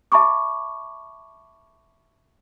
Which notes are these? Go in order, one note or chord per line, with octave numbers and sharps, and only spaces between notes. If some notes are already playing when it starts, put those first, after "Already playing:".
E5 A5 B5 C#6 D6